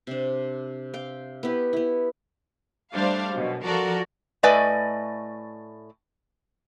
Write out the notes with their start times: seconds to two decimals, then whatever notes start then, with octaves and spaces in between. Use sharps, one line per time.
0.07 C3 D4
0.94 F5 G5
1.43 B3 E4 G4 B4
1.73 B3 E4
2.92 G3 A3 D4 C5 F5
3.33 F#2 B2
3.63 F3 F4 F#4 A4 A#4 D5
4.43 A2 A3 B4 D5 D#5 G#5